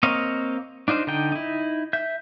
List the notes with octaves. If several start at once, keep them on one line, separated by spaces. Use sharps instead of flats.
A#3 C4 C#5 D#5 F5
D4 D#4 F4 C5
D3 D#4 G5
D#4 E4
E5 G6